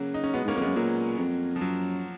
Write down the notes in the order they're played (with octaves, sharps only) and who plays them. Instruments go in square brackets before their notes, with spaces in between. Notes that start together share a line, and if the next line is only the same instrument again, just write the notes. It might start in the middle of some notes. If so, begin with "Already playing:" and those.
Already playing: [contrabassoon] C#3 [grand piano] F#3 A#3
[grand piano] D#4
C#4
[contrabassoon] B2 [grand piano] G#3 B3
[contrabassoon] G#2 [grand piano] A#3 C#4
[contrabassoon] F2 [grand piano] A#3
[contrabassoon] F#2 [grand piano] G#3 B3
[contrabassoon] A#2 [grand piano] F#3 A#3
[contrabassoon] F2
[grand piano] F3
[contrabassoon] F#2 [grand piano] F#3